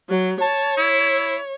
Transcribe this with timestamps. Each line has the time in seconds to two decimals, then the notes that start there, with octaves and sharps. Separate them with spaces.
0.10 F#3
0.41 C#5 A5
0.77 E4